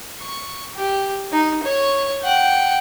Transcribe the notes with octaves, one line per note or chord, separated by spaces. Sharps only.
C#6
G4
D#4
C#5 C#6
F#5 G5